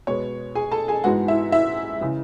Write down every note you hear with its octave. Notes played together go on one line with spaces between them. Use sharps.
B2 G#3 B3 C#5
G#4 G#5
A4 A5
G#4 G#5
G#2 E3 G#3 B3 F#4 F#5
E4 E5
E4 E5
C#3 E3